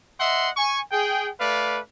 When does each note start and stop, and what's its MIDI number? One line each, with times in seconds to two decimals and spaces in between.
0.19 0.49 75
0.19 0.49 76
0.19 0.49 78
0.19 0.49 84
0.56 0.80 80
0.56 0.80 85
0.91 1.29 68
0.91 1.29 79
1.39 1.78 57
1.39 1.78 71
1.39 1.78 74
1.39 1.78 77